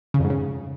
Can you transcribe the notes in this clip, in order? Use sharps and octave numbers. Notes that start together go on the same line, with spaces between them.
C#3
F2
G#2
C#3